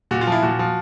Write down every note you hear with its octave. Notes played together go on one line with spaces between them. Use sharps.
A#2 F#4
F4
F3 E4
A#2 F#4
F3